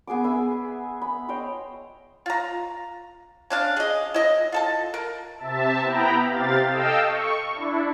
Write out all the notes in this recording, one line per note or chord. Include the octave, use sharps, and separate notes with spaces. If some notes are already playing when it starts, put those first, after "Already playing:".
B3 G#4 G#5 D6
G#4 B4 E5
B5
C5 C#5 D#5 G5
F4 A#5
C#4 D4 F5
G#4 D#5
E4 D#5
F4 A4 A5
A#4
C3 E5 A5
B3 E4 G5 A#5 B5
C3 G4 F5 A6
A4 D#5 F5 G5 E6
C#6
D4 E4